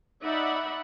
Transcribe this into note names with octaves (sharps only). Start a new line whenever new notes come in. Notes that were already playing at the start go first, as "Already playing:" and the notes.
D#4 D5 E5 F#5 B5